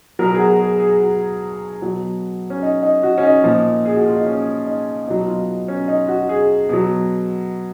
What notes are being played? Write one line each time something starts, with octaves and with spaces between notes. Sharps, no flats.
B2 F#3 A#4
G#4
F#4
G#4
G#4
F#4
B2 F#3
C#4
D#4
D#4
F#4
C#4
D#4
A#2 F3
G#4
F#4
F4
D#4
C#4
D#4
B2 F#3 D#4
F4
C#4
D#4
F#4
G#4
B2 F#3